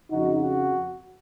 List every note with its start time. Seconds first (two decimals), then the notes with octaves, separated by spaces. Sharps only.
0.11 F2 C#3 F3 D#4 F#4
0.41 F#4